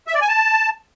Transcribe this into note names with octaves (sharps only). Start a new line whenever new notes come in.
E5
D5
G#5
A5